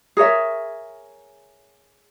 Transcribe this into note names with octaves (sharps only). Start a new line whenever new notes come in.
G#4 A#4 C#5 E5